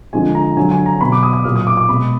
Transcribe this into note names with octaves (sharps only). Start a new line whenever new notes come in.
D3 F3 G#3 G#5
A#5
D3 F#3 G#5
G#5
A#5
B2 F#3 B5
D6
D#6
D#6
A#2 F#3 F6
D#6
D6
D6
B2 G#3 B5